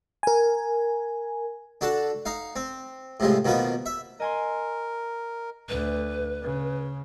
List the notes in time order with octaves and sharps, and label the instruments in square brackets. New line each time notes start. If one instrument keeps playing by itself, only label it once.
[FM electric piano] A#4 G#5
[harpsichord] D4 F#4 A4 A5
D#4 F5
C4
A2 C3 F3 G#3
B2 D#3 F3 A#3 B3
E5
[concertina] A#4 [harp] D#5 G#5 C6
[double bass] D2 [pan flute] B4
[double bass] C#3